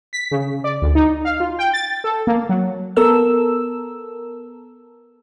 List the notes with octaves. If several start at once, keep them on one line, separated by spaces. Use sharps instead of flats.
B6
C#3
D5
D2
D#4
F5
F4
G5
A6
A4
A#3
F#3
B3 A4 A#4 E6